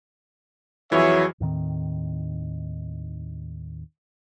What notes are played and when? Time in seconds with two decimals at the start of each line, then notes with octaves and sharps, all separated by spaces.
0.92 F2 E3 F#3 G#4 C#5 E5
1.40 D#2 A2 D#3 C4